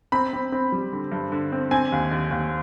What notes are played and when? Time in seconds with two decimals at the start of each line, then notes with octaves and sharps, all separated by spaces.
0.12 C4 B5
0.33 C4
0.52 C4
0.72 G3
0.92 D3
1.12 G2
1.32 D3
1.52 C4
1.71 C4 G#5
1.92 D#2
2.11 D#2
2.31 D#2